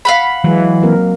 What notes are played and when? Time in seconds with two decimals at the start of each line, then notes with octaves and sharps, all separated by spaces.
0.05 F5 F#5 B5
0.44 E3 F#3 G#3
0.83 A#3 C4 A#4